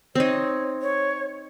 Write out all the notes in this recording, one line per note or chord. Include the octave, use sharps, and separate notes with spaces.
C4 D#4 C#5
C#5